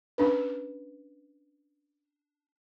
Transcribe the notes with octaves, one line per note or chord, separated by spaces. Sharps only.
C#4 D4 B4